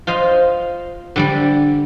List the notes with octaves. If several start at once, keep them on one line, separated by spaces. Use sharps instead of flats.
F4 C5 D#5 F5
D3 G3 D5